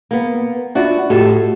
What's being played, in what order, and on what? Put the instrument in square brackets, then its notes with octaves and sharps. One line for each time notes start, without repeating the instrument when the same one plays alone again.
[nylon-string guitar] A#3 B3
[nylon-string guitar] D4 F#4 [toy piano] F4 D#5 E5
[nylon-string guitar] A2 A4 [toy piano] F#4 G4 D#5